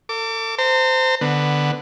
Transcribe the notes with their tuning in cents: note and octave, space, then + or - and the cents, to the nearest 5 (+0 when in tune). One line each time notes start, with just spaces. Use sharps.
A4 +40 D6 -20
C5 -15 A#5 -40
D3 +5 B3 +0